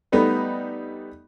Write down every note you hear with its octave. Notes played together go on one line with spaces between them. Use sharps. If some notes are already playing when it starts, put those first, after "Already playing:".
G3 A3 B3 D#4